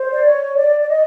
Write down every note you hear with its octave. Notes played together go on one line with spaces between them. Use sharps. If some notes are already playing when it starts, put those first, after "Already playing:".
Already playing: C5
D5
C#5
D5
D5
D#5